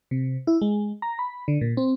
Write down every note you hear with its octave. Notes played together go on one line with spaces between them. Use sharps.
C3
E4
G#3
A#5
B5
D3
A#2
C4